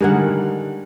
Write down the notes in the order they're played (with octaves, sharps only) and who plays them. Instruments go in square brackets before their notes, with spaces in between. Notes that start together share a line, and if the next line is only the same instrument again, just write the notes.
[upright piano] D3 D#3 G3 [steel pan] G#4 A#4 F#5